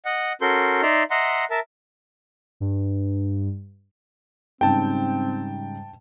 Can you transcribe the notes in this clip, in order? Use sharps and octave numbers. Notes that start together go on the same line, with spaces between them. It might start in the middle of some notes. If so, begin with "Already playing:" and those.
D#5 F#5
C#4 F#4 A4 A#4 C6 G6
D#4 D5 E5 A#5 C6
D#5 E5 F#5 A#5 C6
A#4 E5 A5
G2
G#2 C#3 G3 C4 G5 A5